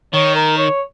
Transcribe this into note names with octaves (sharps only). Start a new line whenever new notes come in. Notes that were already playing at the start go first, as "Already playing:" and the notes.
D#3 C#5
A#4
C#5